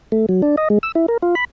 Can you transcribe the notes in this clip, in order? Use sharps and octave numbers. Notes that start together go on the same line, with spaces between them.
A3
F#3
D4
D#5
G#3
E6
E4
A#4
F4
B5